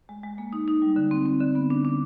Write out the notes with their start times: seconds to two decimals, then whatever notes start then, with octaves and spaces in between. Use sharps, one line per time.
0.09 G#3
0.23 G#3
0.38 A#3
0.53 D#4
0.68 D#4
0.82 G3
0.96 D3
1.11 C4
1.26 C4
1.41 D3
1.55 B3
1.70 D4
1.85 D4